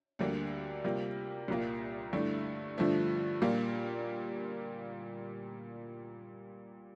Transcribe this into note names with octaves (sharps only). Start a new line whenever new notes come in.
D2 D3 G3 A#3 D4
C3 G3 A#3 F4
C2 A#2 G3 A#3 F4
G2 D3 A3 E4
G2 D3 F3 A3
A#2 G3 A#3 F4